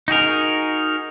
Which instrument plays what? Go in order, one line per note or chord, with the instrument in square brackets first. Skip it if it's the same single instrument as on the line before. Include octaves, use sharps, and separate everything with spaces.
[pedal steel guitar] D#4 F#4 G#4 A#4